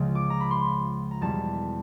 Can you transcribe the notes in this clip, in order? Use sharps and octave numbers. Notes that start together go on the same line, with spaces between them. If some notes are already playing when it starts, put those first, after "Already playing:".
Already playing: C#2 C#3 F3 G#3
D6
A#5
B5
C6
A#5
E2 B2 G3 A5